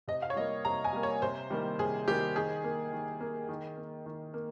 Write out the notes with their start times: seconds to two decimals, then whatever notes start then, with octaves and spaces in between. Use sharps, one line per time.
0.08 C3 D#5
0.22 F5
0.30 C#5
0.36 G3 A#3 D#5
0.65 C3 A#5
0.84 G#5
0.93 G3 A#3
1.03 C#5
1.22 C3 C5
1.50 D#3 G3 A#3
1.79 C3 G#4
2.08 D#3 G3 A#3 G4
2.35 D#3 G#4
2.64 A#3
2.93 D#3
3.21 A#3
3.49 D#3
3.77 A#3
4.06 D#3
4.34 A#3